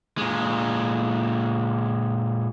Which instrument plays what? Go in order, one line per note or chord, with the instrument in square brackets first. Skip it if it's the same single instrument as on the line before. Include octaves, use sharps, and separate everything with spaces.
[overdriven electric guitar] A#2 G#3